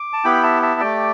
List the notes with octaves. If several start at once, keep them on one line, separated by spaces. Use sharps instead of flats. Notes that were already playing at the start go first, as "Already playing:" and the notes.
Already playing: D6
A5
B3 E4 G4 G5 B5
E5 A5
E5 A5
A3 G4 D5 G5